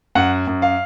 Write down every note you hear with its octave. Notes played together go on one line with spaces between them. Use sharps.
F#2 F#5
F#2
F5